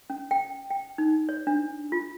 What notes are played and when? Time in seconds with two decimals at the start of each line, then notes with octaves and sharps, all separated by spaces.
0.10 C#4
0.31 G5
0.70 G5
0.98 D#4
1.29 C#5
1.47 D4
1.92 F4